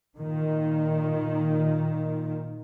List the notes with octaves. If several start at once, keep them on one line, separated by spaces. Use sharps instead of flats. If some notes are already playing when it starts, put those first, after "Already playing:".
A#2 D#3